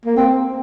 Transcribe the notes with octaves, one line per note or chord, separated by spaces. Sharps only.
A#3
C4